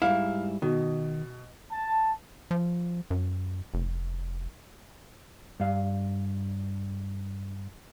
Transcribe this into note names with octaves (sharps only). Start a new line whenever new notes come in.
G#2 G3 E4 F5
B2 D#3
A5
F3
F#2
F1
G2 F5